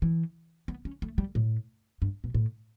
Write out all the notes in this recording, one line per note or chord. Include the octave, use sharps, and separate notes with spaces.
E3
B3
C#4
A3
G3
A2
G2
B2
A2